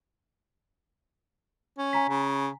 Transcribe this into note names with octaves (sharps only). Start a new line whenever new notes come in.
C#4
G#5 A#5 B6
C#3